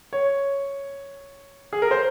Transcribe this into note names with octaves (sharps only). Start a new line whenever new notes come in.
C#5
G#4
A#4
C5